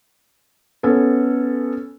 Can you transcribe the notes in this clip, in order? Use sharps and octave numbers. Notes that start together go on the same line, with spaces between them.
B3 C#4 A4